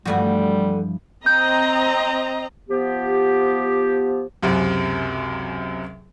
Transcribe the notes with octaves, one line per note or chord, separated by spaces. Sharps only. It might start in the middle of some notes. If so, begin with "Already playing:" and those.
G2 D3 E3 F3 G3 A3 F#4
C4 D#5 A#5 G6
F3 B3 G4
C#2 F#2 C3